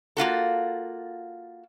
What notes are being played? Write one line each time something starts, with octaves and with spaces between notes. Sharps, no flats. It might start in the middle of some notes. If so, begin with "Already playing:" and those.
A#3 F4 F#4 A4